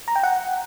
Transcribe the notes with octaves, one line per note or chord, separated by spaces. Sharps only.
A#5
G5
F#5